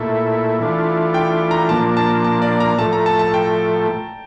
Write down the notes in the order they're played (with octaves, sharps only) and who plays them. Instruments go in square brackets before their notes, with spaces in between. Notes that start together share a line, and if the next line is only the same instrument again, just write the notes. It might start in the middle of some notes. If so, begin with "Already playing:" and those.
Already playing: [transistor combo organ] A#2 A3 E4
E3 A3 D4 F4
[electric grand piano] G5
A#5
[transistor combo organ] A#2 F3 A#3 D4 [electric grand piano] A5
[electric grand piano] A5
A5
D5
A#5
[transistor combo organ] A2 F3 A3 [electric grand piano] A5
[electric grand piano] A#5
A5
A5
G5